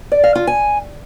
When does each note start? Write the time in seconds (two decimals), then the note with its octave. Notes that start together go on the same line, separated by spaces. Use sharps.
0.12 D5
0.24 F5
0.35 F4
0.47 G#5